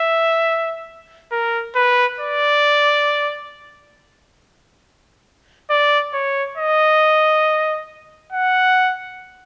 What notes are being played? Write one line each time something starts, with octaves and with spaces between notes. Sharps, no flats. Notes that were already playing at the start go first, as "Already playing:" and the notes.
Already playing: E5
A#4
B4
D5
D5
C#5
D#5
F#5